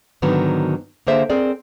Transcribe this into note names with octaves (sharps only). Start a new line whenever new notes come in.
G#2 D3 D#3 F#3 B3
D3 A#3 G#4 C5 E5
C4 G#4 A#4 D5